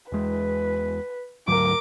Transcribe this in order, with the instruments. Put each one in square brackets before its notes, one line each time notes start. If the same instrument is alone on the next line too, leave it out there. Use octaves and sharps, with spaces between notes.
[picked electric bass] E2 G#3 [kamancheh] B4
[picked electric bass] D2 G#2 F#3 [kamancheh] A#4 D6